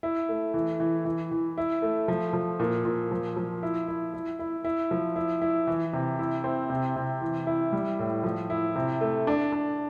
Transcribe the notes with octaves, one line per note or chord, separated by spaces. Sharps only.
E4
A3
E3
E3
E3
E3
E4
A3
F3
F3
A#2
A#2
F3
F3
E4
E4
E4
E4
E4
F3
E4
E4
E3
C3
E4
C4
C3
C3
E3
E4
G3
A2
F3
E4
C3
A3
D4
D4